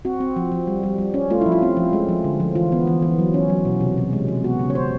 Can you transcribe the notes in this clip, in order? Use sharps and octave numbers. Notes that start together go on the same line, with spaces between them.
C4 F#4
C4
F3
F3
G3
G3
G3
C#4
A3 F4
F3 E4
F4
C4
F3
G#3
F3
D3
F3
E3 F4
B3
E3
E3
F#3
C#4
F#3
B2
C3
C3
G#3
C3
B3 F#4
C#3
C#5
C#3 C5